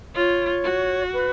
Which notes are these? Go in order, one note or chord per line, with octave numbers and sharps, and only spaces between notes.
F4 C#5
F#4
B4